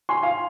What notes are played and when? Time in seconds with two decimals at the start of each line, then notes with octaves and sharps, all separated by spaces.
0.09 G#5 C6
0.23 F5 G#5